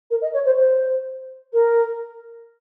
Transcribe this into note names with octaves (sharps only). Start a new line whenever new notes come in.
A#4
D#5
C#5
C5
C5
A#4